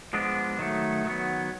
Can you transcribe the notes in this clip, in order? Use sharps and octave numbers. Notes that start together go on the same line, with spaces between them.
F3 G#3 B3 D4
D#3 F#3 A3
D#3 F#3 B3